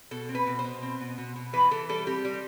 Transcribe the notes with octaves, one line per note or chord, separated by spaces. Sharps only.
B2 A4
C4
B4
B2
C5
B2
C4
B2
B2
B2
E3 B4
E3 A4
G3 A4
C4 G4
G3